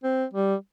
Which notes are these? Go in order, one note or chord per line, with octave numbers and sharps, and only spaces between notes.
C4
G3